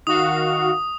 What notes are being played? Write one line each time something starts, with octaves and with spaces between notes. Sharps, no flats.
D#3 F#4 F5 D#6